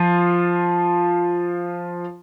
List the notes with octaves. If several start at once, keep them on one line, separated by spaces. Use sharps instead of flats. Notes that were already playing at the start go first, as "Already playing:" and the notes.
Already playing: F3 F4